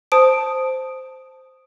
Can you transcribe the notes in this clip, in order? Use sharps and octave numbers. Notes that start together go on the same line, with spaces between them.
C5 A5 D#6 D7